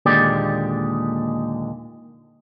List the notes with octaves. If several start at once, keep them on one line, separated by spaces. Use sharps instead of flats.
D#2 A#2 D3 G#3 G4 D5